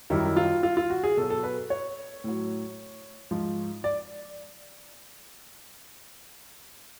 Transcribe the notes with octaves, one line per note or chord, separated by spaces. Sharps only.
F#2 D#3 G3 E4
E4
F4
F4
F4
F#4
G#4
B2 F#3 A4
A4
B4
C#5
A2 F#3
G#2 F3
D5